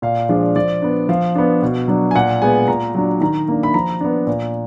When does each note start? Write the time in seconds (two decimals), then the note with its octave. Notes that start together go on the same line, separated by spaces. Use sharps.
0.02 A#2 F5
0.29 F3 G#3 D4
0.56 F3 D5
0.82 B3 D4
1.09 F3 F5
1.35 B3 D4
1.63 B2
1.88 F#3 D4
2.11 G#5
2.15 A#2 F#5
2.42 G#3 B3 G#5
2.68 A#2 A#5
2.95 F#3 D4
3.21 D#3 A#5
3.48 A#3 D4
3.63 B5
3.74 F3 A#5
4.01 B3 D4
4.27 A#2